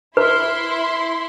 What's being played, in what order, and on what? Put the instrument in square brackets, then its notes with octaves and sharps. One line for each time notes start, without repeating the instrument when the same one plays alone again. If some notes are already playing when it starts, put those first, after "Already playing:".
[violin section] E4 C6 [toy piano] B4